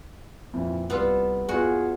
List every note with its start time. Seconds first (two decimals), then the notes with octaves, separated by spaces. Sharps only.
0.53 F2 A#2 E3
0.90 C2 B3 F4 A4 E6
1.49 E2 F4 F#4 G#4